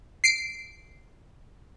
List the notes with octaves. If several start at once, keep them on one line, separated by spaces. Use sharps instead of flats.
C7 D7